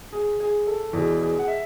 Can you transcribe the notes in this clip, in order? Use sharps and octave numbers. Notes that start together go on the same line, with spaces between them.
G#4
G#4
A4
E2 B2 G#4
G#4
F#5
E5